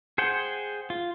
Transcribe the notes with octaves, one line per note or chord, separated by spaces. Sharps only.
G#4 C5 F#5 G5
F4